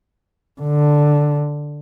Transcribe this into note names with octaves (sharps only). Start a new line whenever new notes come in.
D3